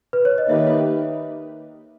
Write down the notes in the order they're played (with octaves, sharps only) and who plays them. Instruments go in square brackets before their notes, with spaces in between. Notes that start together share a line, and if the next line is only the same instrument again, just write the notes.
[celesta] B4
C#5
D#5
[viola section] D#3 A#3 D#4 G4 B4 [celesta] E5